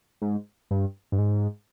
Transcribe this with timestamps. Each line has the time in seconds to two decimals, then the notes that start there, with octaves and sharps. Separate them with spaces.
0.22 G#2
0.71 G2
1.12 G2
1.18 G#2